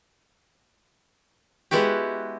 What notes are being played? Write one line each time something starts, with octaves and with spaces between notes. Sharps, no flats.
G#3 B3 E4 F#4 G4